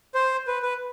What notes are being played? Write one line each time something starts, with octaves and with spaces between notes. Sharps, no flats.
C5
B4
B4